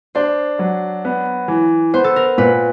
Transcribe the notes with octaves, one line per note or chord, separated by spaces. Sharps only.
D4 C5
F#3
B3
E3
B3 C5
A4
A#4
A#2 B4